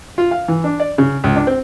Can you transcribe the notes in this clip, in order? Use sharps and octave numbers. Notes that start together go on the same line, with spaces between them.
F4
F5
E3
D4
D5
C#3
C#2
D4
C4